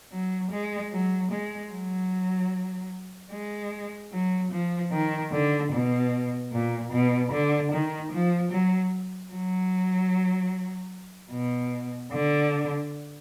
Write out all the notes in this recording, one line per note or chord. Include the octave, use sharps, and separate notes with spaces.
F#3
G#3
F#3
G#3
F#3
G#3
F#3
F3
D#3
D3
B2
A#2
B2
D3
D#3
F3
F#3
F#3
B2
D3